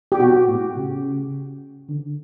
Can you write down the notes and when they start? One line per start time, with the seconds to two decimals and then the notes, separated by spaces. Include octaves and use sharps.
0.12 G4
0.19 B2 F#4
0.47 A2
0.76 C#3
1.89 D3